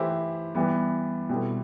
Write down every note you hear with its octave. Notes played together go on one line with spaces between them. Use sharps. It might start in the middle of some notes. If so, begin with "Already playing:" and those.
Already playing: E3 A3 E4 G4 C5
E3 G3 B3
B2 G3 C4 E4 A4